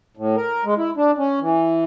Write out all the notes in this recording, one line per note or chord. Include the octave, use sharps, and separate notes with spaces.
A2
A#4
G#3
E4
D4
C#4
E3